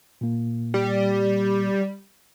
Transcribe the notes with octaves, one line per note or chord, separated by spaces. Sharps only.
A#2 A#3
G3